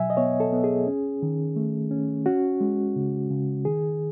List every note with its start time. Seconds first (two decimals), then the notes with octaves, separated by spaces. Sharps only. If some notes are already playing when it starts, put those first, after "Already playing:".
Already playing: B2 F#3 E5 G#5
0.10 D#5
0.17 B3 C#5
0.40 A4
0.52 B3
0.64 G#4
0.87 C#4
1.22 D#3
1.56 A3
1.91 C#4
2.26 C#4 F#4
2.61 G#3
2.96 C#3
3.31 C#3
3.65 D#3 G#4